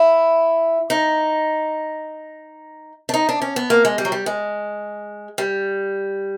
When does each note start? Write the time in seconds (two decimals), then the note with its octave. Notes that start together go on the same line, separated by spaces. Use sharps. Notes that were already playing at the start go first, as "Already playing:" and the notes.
Already playing: E4
0.90 D#4
3.09 D4
3.14 D#4
3.29 D4
3.42 C#4
3.56 B3
3.70 A#3
3.85 G#3
3.98 G3
4.05 F#3
4.12 G3
4.26 G#3
5.38 G3